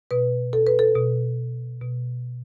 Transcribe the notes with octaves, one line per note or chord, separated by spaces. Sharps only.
B2 B4
A4
B4
A4
B2
B2